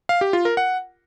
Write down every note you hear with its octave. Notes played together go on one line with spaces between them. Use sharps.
F5
G4
F4
A#4
F#5